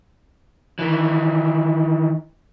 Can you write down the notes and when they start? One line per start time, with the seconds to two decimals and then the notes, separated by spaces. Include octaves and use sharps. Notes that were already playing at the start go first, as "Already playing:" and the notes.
0.79 D#3 E3